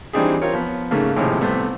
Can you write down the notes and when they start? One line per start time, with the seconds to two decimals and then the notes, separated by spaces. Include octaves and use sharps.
0.13 E3 G3 C4 D4 D#4 G#4
0.42 C4 F4 A#4 C#5
0.53 F3 B3
0.91 G#2 C#3 A3 A#3
1.16 G#1 A2 C3 F3 C4 G#4
1.41 C2 A3 B3 C4 C5